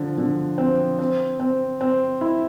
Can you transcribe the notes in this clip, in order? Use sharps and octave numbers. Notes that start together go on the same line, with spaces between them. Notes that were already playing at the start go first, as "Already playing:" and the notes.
Already playing: D3 F3
D3
C4
C4
C4
C4
E4